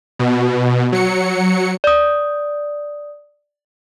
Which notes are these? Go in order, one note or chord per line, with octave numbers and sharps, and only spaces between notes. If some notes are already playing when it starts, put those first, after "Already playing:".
B2
F#3 C#7
D5 D#6